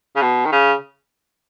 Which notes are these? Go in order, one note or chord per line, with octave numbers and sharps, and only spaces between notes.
C#3
B2
D#3
C#3